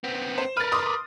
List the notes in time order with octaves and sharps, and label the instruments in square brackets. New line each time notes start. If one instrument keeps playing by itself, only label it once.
[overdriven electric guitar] B3 C4
[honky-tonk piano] C5
[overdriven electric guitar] A#4 B4 [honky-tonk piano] F6 A6
[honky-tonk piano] C6 D6 D#6